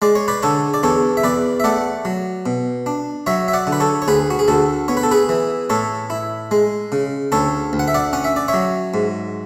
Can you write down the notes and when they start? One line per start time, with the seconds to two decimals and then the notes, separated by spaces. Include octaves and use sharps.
0.02 G#3 D5
0.15 C#5
0.28 B4 D5
0.43 D3 A4 C#5
0.74 D5
0.83 E2 A4 C#5
1.17 E5
1.24 E2 B4 D5
1.60 E5
1.64 A3 D5 F#5
2.05 F#3
2.46 B2
2.86 D4
3.26 F#3 C#5 E5
3.48 E5
3.53 D5 F#5
3.67 D3
3.73 B4
3.80 A4 C#5
4.02 C#5
4.08 D2 G#4 B4
4.30 F#4
4.39 G#4
4.48 D2 F#4 A4
4.88 B3 C#5
4.97 B4
5.03 A4
5.11 G#4 B4
5.29 E3
5.70 A2 A4 C#5
6.10 E4
6.51 G#3
6.92 C#3
7.32 D2 A4 C#5
7.73 D2
7.79 F#5
7.88 E5
7.94 D5 F#5
8.13 C#4 F#5
8.24 E5
8.36 D5
8.48 C#5 E5
8.54 F#3
8.94 G#2